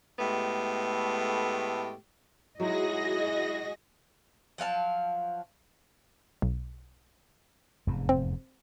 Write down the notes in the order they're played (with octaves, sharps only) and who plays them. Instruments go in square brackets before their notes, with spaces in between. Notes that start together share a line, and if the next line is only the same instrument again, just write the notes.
[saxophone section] A2 G#3 A3 B3 G4
[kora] F#3 G#3 D#4 [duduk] E4 [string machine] F#4 G#4 A#6 [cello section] D#5
[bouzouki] F3 F#3 F5 A5
[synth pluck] B1
[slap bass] F1 E2 G#2
[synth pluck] C4